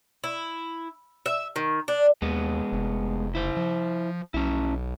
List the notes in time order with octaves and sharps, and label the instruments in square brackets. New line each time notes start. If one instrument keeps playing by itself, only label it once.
[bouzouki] E4
E5
D#3
D4
[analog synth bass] D#2 [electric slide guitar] G#3 B3
[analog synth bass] F1
[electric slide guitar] E4 C5
[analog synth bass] F3
[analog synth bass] B1 [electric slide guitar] C#4 E4